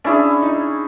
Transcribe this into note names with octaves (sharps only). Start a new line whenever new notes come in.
C#4 D4 E4 G#4
D#4